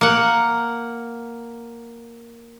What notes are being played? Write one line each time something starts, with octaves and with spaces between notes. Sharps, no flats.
A#3 F#5